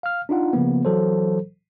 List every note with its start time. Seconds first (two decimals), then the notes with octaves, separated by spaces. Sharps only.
0.03 F5 F6
0.29 D4 D#4 F4 F#5
0.53 C#3 F3 A#3 B3
0.85 E3 F#3 A4 C5